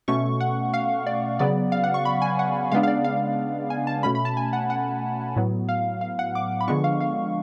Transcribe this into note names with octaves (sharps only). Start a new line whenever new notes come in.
B2 A3 C#4 C#6
F#5
F5
D5
C#3 F#3 B3 D5
F5
F#5
C#6
B5
G#5
F#5
C#3 G#3 B3 D4 F5
F5
D5
F5
G#5
A5
B2 A3 C#4 B5
B5
A5
G#5
F#5
F#5
A2 F#3 B3
F5
F5
F#5
D6
B5
D3 F3 G#3 B3 D4 C#6
F5
F5